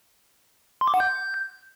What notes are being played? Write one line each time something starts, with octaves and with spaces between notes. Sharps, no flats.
C6
D6
F#5
G6